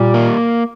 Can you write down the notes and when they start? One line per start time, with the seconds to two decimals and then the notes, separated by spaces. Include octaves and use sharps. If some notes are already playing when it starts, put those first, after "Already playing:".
Already playing: A#2 G3
0.14 A#3